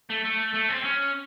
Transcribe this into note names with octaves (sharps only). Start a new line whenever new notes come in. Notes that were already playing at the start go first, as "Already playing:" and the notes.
A3
A3
A3
C4
C#4